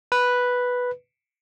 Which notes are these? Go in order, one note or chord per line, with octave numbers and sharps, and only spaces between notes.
B4